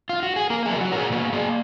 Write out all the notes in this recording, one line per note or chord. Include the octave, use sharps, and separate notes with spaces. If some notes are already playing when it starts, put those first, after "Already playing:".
F4
F#4
G#4
A#3 A#4
G#4
F#3
F#4
A#2 A#4
G#4
A#3 F#4
A#3 G#4